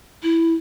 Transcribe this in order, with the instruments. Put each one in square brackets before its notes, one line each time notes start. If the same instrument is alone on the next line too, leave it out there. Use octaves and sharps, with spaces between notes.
[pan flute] E4